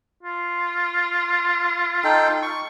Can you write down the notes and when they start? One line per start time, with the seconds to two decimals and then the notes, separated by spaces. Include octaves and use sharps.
0.23 F4
2.04 D#4 A4 G5
2.42 C#6